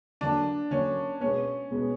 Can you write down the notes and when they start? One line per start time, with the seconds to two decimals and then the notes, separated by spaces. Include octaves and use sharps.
0.21 D3 F#3 A#3 D4
0.71 D3 F#3 A#3 C#4
1.20 B2 G#3 B3 C#4
1.71 B2 G#3 B3